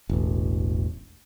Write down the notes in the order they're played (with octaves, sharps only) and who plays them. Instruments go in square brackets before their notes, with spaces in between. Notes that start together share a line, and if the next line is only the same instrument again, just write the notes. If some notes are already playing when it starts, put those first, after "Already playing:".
[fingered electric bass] E1 A1